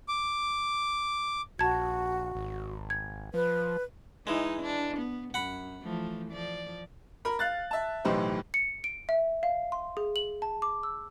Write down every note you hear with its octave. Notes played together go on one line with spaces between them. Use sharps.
D6
A#1 F#4 A5 G#6
G#1
G#6
F3 B4
E3 G#3 D#4
D4
B3
F#2 F#5 B5
E3 F3 A3
F3 D5
A#4 B5
F5 F#6 A6
E5 A5
B1 A2 E3 G4 C5
C#7
D7
E5
F5
C6
G#4
F#7
A5
D6
E6